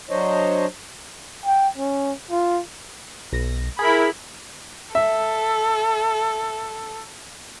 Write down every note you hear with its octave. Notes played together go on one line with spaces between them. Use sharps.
F#3 D4 C5 C#5 D#5
G5
C#4
F4
B1 A#6
E4 G#4 A#4 B5
A4 E5